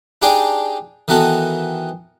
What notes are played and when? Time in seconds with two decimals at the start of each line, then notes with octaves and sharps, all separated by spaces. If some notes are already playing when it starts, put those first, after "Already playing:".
0.22 D4 D#4 G4 G#4 D5
1.08 D#3 E3 B3 F#4 A4